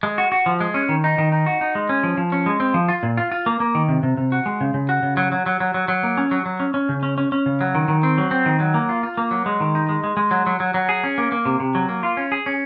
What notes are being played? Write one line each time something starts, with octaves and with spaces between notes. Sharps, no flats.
G#3
F#4
F#4
F3
G#3
C#4
D#3
D#4
D#3
D#4
F#4
D#4
G#3
C#4
F3
F3
C#4
G#3
C4
F3
F4
A#2
F4
F4
A#3
A#3
D#3
C3
C3
C3
F#4
G#3
C#3
C#3
F#4
C#3
F#3
F#3
F#3
F#3
F#3
F#3
A#3
C#4
F#3
F#3
C#4
C#4
C#3
C#4
C#4
C#4
C#3
F#3
D#3
D#3
C4
F#3
C4
D#3
F#3
A#3
F4
F4
A#3
F#3
G#3
D#3
D#4
G#3
G#3
G#3
F#3
F#3
F#3
F#3
G#4
C#4
A#3
A#3
C3
C3
F#3
A#3
F4
C#4
G#4
C#4